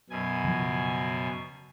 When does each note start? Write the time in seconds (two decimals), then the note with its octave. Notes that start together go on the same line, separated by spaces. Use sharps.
0.10 F#2 B2 G#5
0.44 C#3 F3